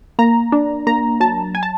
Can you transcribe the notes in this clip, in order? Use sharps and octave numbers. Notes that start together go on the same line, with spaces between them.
A#3 A#5
D4
A#3 A#5
F#3 A5
G#5
A5